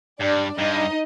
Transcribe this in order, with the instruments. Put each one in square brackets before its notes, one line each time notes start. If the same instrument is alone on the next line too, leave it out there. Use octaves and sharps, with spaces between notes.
[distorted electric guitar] G2 [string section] D4 D5
[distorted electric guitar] G2 [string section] D#4 D#5